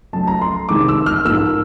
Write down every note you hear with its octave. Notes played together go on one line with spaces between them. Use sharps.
F#2 C#3 F#3 A3 A5
A#5
C6
F2 C3 D#3 G#3 D6
E6
F6
G#2 F3 A#3 E6